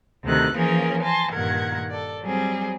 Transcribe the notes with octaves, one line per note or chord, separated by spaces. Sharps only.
D2 C3 D#3 A4 F#6
E3 F3 A#3 C#4 G#4 A#4
G#5 A5 C6 A#6
G2 A#2 D#3 A#4 F#5 G#6
A4 D5
F#3 G3 C4 G#4